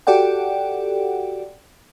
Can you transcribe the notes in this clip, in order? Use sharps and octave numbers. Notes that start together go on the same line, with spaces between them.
F#4 G4 A4 D5 F#5 G5